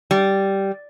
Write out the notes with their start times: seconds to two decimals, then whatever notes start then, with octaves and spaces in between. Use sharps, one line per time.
0.11 G3